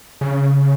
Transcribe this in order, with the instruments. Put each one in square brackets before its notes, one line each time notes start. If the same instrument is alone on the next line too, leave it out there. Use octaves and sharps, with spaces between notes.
[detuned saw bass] C#3